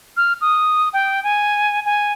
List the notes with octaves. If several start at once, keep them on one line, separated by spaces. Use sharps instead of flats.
F6
D#6
G5
G#5
G#5